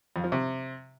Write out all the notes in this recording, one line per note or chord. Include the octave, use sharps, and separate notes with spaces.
F2
F3
C3